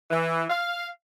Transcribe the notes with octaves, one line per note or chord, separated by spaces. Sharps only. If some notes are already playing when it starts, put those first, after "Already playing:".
E3
F5